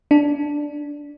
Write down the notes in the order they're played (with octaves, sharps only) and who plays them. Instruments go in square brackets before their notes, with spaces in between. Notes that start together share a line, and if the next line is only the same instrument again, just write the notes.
[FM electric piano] D4